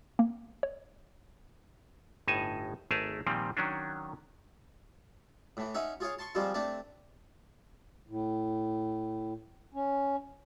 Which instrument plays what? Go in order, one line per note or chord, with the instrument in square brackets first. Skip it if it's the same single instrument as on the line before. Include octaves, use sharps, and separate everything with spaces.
[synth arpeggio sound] A#3
C#5
[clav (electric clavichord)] G1 A2 D#4 G#5 A5
G#1 A3 G#4 A#4 E5 A5
A#2 D#3 F3 G3 C4
D#3 F#3 C#4 D4
[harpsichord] A2 E3
C#4 D#4 E5 F#5
F4 G#4 C#5 F5
A5 C6 C#6
F3 G3 G#3 C4 F4
A3 C4 D4 A5
[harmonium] A2
C#4